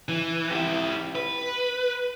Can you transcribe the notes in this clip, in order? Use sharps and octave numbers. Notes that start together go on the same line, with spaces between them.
E3
E4 G4
B4